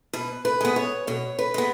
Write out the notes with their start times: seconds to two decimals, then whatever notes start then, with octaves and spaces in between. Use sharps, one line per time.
0.13 B2 B4
0.45 B4
0.61 G#3 B3
0.76 C#5
1.07 B2 C#5
1.39 B4
1.54 G#3 B3